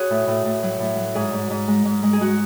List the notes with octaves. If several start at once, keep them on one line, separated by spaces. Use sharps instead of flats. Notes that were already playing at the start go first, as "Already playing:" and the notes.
Already playing: F#4 G#4 B4 C#5
A2
A2
A2
F#3
A2
F#3
G#2 G#4
G#2
G#2
G#3
G#2
G#3
G#4
G#3 F#4